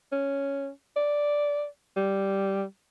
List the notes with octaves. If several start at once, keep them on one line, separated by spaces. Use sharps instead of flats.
C#4
D5
G3